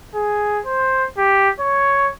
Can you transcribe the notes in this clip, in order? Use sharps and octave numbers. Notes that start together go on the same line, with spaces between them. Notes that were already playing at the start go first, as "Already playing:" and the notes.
G#4
C5
G4
C#5